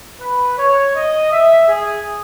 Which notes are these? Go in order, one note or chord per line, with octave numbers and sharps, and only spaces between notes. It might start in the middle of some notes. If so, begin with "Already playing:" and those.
B4
C#5
D#5
E5
G#4